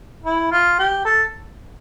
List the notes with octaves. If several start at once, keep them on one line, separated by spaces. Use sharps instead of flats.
E4
F4
G4
A4